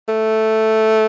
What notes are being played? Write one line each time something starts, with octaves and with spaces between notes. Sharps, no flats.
A3